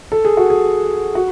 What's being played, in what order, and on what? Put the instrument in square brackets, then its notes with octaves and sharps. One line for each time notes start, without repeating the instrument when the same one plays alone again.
[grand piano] A4
G#4
F#4
G#4
F#4